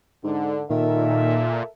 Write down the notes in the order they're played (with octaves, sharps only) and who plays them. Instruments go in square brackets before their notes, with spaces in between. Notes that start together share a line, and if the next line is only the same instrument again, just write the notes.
[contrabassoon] G#2 [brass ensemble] D3
[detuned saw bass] A#2 [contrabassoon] D#3 [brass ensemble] A4 A#4 E5